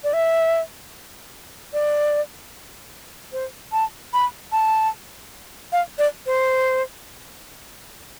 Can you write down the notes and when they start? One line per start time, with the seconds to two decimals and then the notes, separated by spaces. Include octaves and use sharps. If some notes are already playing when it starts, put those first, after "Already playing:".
0.04 D5
0.13 E5
1.73 D5
3.33 C5
3.72 A5
4.14 B5
4.52 A5
5.72 F5
5.99 D5
6.26 C5